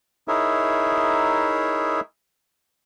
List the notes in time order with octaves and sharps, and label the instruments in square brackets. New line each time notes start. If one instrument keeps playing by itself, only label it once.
[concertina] D#4 E4 G#4 A#4 C#5 E5